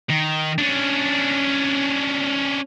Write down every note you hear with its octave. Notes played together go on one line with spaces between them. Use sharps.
D#3
C#4 D4